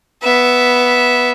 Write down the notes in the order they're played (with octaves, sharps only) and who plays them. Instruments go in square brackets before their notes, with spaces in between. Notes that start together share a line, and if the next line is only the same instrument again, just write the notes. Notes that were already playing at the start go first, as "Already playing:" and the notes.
[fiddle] B3 E5